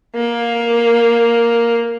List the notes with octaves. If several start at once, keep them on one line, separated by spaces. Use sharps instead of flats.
A#3